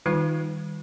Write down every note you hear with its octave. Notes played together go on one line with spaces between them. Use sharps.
D#3 G3 D#4 F4